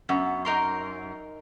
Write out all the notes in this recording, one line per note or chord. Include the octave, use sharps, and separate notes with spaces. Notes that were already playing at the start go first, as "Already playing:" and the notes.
F#2 B3
D#4 A#4 C6